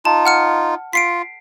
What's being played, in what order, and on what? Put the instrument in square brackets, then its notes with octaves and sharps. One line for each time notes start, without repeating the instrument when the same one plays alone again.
[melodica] D#4 F4 [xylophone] A5
[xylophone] F#5 F6 C#7
[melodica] F4 [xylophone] B6 C7 D7